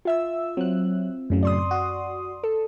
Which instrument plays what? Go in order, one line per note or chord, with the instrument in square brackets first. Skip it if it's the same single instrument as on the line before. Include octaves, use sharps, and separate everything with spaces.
[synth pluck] F4 E5 E6
[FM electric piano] F#3 F#6 [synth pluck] C4
[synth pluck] F#2 [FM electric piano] A2 C#3 F#3
[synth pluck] D5 C6 D#6
[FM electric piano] F#4
[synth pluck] A4